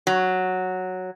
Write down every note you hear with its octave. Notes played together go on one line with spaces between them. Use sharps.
F#3